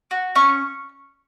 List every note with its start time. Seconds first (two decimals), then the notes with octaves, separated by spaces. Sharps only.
0.11 F#4
0.35 C#4 C#6